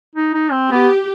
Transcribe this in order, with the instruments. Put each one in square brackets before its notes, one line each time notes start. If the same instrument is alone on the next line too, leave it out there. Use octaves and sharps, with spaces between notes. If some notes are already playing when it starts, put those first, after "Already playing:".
[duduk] D#4
D#4
C4
[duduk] B3 [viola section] G4